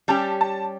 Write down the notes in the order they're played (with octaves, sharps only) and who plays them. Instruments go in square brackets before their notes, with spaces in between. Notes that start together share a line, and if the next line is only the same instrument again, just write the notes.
[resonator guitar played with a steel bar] G3 C#4 G4 [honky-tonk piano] A5
[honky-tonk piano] A5